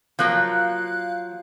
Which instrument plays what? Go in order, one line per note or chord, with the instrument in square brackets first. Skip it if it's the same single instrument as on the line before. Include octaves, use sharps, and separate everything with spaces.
[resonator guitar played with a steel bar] F3 F#3 A#3 [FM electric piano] F5 F#6